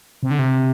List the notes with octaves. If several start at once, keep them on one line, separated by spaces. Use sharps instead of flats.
C3
D3
C3